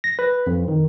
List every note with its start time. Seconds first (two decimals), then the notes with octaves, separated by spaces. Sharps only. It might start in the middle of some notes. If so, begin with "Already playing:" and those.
0.04 A#6
0.19 B4
0.47 F2
0.68 D#3